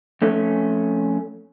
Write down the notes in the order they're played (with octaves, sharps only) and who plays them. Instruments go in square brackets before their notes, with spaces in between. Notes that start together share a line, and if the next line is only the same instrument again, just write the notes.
[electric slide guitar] F2 A3 C#4